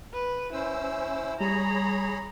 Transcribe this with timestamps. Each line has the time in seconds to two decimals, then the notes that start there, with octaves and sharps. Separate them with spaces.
0.14 B4
0.52 C#4 E4 C5 E6
1.41 G3 G#4 C#5 A#5 B5